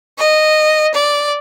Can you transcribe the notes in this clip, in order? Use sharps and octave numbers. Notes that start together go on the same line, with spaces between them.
D#5
D5